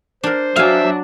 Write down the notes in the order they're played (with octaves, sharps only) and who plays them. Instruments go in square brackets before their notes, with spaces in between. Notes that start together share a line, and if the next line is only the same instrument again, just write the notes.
[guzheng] D4 A#4 [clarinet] C5
[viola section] F#3 D4 F#4 [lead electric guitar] E5 [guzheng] F5 G#5